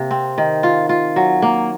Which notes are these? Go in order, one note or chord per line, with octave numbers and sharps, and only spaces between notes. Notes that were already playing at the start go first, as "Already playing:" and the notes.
Already playing: C3 A#3
C4
D#3
F4
F4
F#3
A#3